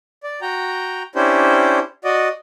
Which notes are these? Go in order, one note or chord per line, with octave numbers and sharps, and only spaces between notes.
D5
F#4 G5 A#5
C#4 D4 E4 G4 C5
F#4 D5 D#5